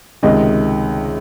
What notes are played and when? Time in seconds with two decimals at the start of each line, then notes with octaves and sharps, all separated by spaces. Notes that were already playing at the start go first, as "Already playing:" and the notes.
0.23 C#2 C3 D#3 D#5